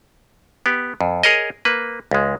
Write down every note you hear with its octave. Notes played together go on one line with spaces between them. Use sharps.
B3 G4
F2
G#4 A#4 C#5 D#5
A#3 B4
C#2 G#3